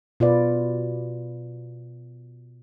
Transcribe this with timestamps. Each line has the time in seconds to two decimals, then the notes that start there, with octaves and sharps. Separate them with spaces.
0.20 B2 F4 B4 D5